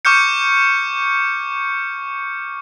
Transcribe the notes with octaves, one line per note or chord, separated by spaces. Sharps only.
C#6 D6 F6 G6 C#7